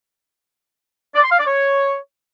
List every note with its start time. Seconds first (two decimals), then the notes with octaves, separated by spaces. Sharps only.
1.15 D5
1.23 C6
1.31 F5
1.39 D5
1.47 C#5